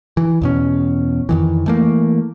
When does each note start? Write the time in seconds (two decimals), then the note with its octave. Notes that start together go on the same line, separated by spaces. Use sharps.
0.17 E3
0.42 E2 B2 C#4
1.29 F2 D#3 E3
1.66 E3 A3 A#3